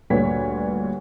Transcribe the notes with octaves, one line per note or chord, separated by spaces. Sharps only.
D2 G2 A#2 B4 C#5 B6